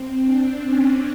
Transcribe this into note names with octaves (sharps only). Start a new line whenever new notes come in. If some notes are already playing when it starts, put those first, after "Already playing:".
Already playing: C4
D4
C#4